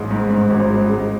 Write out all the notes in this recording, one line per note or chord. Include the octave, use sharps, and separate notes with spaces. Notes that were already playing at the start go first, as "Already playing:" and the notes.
Already playing: A1 G#2 G#3
G#2
G#2
G#1
G#3
G#3